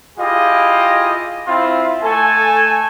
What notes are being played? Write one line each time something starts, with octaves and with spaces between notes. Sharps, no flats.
E4 F4 G4 G#4 D#5
C4 E4 F4 F5
A3 A4 G#5